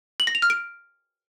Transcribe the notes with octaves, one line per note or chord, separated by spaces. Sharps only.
F#7
A#6
F7
F6
D7